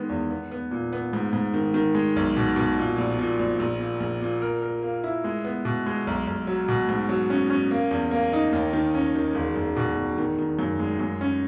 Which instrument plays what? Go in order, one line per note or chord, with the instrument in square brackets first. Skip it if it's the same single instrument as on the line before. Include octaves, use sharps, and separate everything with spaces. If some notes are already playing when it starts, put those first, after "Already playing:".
Already playing: [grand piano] D#3 G#3 B3
E2
B3
B3
A#2
B3
G#2
G#2
D#3
D#3
G#3
B1
B2
B2
A#2
A#1
A#2
A#1
A#1
A#2
A#1
A#2
A#4
A#4
A#3
E4
G#3
B3
B2
G#3
B1
B1
F#3
B2
G#2
F#3
C#4
C#4
A#3
E2
A#3
D#4
D#2
D#3
C#4
D#3
E1
E1
B2
E1
D#3
D#3
F#2
G#3
F#2
C#4